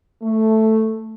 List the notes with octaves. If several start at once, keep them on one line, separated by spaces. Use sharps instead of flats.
A3